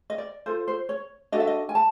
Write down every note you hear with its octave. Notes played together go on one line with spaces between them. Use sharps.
D#5
D5
F4 A4 C5
C5
C#5
D4 F#4 A4 D#5
E5
D#5
G#5
A5